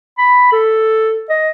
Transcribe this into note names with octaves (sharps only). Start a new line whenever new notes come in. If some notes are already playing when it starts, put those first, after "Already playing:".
B5
A4
D#5